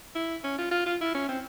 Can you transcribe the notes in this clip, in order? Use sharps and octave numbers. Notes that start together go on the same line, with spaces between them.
E4
C#4
F4
F4
F4
E4
C#4
C4